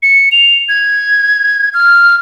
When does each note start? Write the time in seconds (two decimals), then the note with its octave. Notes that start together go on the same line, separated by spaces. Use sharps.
0.03 C#7
0.32 F7
0.69 G#6
1.74 F6